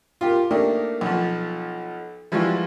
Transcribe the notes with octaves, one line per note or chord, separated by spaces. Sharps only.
F4 G4 A#4
A3 A#3 D4 D#4 G4
B1 F3
E3 F3 G3 G#3 F4 F#4